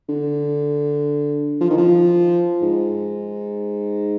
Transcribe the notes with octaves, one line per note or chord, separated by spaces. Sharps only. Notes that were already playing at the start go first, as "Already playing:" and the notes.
D3
F3
D#3
F3
G#2